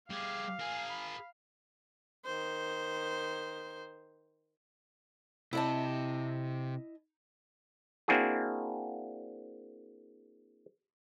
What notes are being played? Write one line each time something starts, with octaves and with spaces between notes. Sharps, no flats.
G3 G4 G#4 F5
G#4 A#4 G#5
B5
D#3 C5
C3 E4 D#5 A5
A#3 C4 D4 E4 F#4 G#4